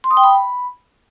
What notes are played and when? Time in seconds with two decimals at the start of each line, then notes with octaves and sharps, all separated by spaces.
0.04 C6
0.11 D#6
0.17 G5
0.24 B5